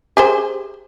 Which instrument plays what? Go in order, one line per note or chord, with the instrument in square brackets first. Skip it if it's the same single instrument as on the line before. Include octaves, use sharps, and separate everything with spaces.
[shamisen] G4 G#4 C5